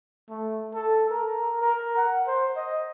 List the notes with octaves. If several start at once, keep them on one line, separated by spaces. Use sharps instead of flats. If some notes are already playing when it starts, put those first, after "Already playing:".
A3
A4
A#4
A#4
F#5
C5
D#5